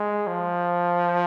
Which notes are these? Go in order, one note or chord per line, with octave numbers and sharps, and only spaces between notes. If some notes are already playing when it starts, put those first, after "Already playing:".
Already playing: G#3
F3